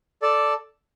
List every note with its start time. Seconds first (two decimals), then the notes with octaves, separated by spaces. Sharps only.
0.22 A4 D5 A5